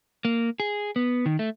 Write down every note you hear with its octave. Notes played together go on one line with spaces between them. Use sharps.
A#3
G#4
B3
D#3
A3